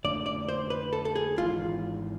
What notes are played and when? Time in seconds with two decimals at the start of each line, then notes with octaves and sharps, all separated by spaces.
0.04 F2 D3 A3 D4 D5
0.26 D5
0.48 C5
0.70 B4
0.93 A4
1.05 A4
1.15 G#4
1.38 G#1 G#2 E3 B3 F4